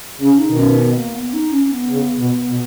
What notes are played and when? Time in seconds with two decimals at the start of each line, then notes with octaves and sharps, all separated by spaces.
0.20 C#3 C#4
0.38 D#4
0.47 B2 D#3
0.57 C#4
0.76 B3
0.96 A#3
1.14 B3
1.33 D#4
1.52 C#4
1.71 B3
1.90 C#3
2.18 B2
2.47 B2